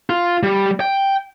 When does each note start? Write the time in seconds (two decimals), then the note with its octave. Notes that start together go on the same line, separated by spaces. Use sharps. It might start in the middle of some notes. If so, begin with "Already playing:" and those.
0.10 F4
0.43 G3
0.80 G5